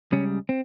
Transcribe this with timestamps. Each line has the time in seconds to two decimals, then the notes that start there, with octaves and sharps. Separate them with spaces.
0.12 C#2 C#3 G3 C#4
0.49 C4